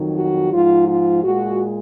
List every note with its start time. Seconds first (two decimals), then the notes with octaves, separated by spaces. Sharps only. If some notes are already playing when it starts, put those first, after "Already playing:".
Already playing: F2 D#3 F#3
0.16 F#4
0.52 G#2 F3 G#3 F4
0.87 F4
1.23 A#2 G#3 F#4